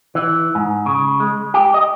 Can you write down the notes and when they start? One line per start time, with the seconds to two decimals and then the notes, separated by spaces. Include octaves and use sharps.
0.15 E3
0.55 G#2
0.86 C#3
1.20 G#3
1.54 G4
1.74 D#5